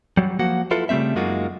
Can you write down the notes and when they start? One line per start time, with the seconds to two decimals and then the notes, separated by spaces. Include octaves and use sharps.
0.17 F#3 G3
0.39 F3 A#3 F#4 F#5
0.71 E4 F4 A4 B4
0.89 C#3 G3 A3 C4 E5
1.16 F#2 G#3 A#3 D#4 F4 F#4